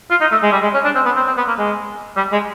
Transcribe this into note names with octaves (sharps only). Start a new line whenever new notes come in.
F4
D#4
A3
G#3
G3
G#3
C#4
D4
C4
B3
C4
C4
B3
A#3
G#3
G3
G#3